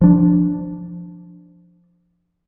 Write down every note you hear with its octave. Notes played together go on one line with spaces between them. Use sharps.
F3 D4